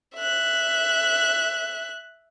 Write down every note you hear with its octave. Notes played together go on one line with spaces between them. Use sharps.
E5 F#6